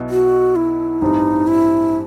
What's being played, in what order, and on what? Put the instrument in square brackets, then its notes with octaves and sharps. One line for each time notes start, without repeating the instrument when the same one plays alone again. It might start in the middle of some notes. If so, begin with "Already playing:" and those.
Already playing: [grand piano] B1 B2 F#3 B3 E4
[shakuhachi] F#4
E4
[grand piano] A1 G2 E3 G3 C4 [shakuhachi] D#4
[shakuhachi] E4